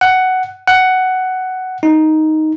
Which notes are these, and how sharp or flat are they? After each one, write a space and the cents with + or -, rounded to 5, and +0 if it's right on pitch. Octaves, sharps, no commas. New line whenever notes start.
F#5 +10
F#5 +10
D#4 +5